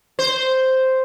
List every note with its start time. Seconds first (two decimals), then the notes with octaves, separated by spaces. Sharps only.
0.19 C5